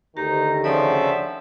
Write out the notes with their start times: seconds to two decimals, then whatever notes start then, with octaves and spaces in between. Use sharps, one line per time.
0.17 D2 D#3 D#4 G4
0.64 C#3 F3 D5 E5 F#5 C6 E6